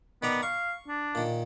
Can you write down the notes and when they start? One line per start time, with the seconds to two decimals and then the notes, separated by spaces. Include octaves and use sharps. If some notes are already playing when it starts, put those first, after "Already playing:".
0.23 D#3 B3 D5 A#5
0.43 F5 C#6
0.88 D4
1.15 A#2 D#3